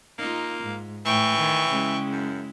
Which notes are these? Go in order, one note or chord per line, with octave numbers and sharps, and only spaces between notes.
A#3 D#4 F4
G#2
A2 E3 G5 C#6
D#3
C#3 G#3 E4
F#2